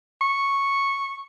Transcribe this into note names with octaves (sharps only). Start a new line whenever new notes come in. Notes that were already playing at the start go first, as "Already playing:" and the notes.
C#6